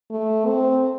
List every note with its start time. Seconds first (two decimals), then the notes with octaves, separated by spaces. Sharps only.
0.11 A3
0.47 C4